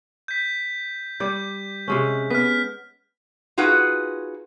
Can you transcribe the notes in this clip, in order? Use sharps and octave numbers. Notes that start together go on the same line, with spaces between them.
G6 B6
G3 D5 G6
C3 G#3 C#4
B3 F6 B6
D#4 F4 F#4 G#4 B4 F#5